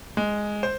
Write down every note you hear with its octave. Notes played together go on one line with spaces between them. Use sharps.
G#3
C5